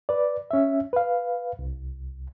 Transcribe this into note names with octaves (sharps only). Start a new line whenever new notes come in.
B4 D5
C#4 E5
B4 F5
C2